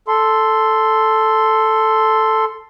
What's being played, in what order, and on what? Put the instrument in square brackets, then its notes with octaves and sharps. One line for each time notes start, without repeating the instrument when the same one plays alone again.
[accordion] A4 C6